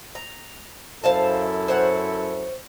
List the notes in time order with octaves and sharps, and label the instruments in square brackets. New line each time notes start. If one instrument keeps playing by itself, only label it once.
[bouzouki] A#5
[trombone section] F#2 E4 A4 [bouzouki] C5 F5 A5
[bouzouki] C5 C#5 F#5